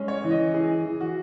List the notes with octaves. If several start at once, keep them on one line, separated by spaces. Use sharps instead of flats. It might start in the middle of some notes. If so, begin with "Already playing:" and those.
Already playing: G#3 C#4
C#5
E3
D#5
E3 G#4
E3
F#4